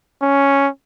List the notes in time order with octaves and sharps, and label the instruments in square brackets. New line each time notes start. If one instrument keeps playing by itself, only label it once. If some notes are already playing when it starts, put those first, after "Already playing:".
[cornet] C#4